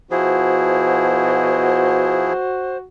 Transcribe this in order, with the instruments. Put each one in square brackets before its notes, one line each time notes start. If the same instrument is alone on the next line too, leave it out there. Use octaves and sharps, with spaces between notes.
[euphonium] B2 [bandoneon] F3 E4 G#4 [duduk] F#4 [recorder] C5